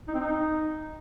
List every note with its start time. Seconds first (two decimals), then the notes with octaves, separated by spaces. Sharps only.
0.08 D#4
0.14 C4
0.20 D#4